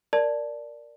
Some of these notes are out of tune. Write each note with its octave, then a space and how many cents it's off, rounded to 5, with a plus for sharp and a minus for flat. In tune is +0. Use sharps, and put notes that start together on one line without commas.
A#4 +0 D5 +0 A5 +0